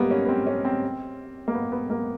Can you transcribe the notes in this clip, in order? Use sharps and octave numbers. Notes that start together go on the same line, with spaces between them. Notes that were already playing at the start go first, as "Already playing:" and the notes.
Already playing: G3 A#3 B3
C#4
B3
C4
C#4
C4
A#3
B3
B3
A#3